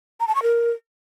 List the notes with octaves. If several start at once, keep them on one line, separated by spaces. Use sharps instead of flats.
A#5
A5
C#6
A#4